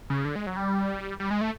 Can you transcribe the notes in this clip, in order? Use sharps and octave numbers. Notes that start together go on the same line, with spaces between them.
C#3
D3
G#3
F#3
G3
G3
G#3
A3